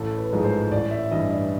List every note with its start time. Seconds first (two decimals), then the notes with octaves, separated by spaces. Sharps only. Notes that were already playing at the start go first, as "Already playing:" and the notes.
Already playing: A1 A4
0.18 B4
0.32 G#2 F3 G#3
0.45 C5
0.71 A1 D5
0.91 E5
1.11 G2 E3 D#5
1.30 D5